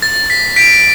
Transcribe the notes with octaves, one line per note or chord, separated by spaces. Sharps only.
A6
B6
B6 D7